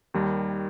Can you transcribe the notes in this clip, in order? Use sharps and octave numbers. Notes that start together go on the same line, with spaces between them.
D#2 D#3 G3